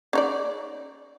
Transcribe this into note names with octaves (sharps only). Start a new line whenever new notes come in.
C#4 D#4 D5